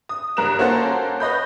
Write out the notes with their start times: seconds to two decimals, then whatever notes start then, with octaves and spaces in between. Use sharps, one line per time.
0.09 D#6
0.37 F#1 G2 A#4 F#6 E7
0.59 A#3 C#4 F#4 A4 C5
1.20 B4 C#5 D#5 B5 G6